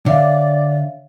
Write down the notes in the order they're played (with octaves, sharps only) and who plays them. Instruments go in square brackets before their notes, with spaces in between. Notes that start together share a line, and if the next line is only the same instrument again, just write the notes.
[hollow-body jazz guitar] D3 [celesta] C#5 E5 F5 [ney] D5